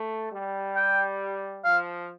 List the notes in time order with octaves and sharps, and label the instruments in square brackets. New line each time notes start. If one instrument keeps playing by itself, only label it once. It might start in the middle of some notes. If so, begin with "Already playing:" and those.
Already playing: [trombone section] A3
G3
[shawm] G5
[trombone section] F3 [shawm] F5